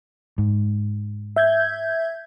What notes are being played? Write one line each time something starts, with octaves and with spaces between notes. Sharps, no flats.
G#2
E5 G6 G#6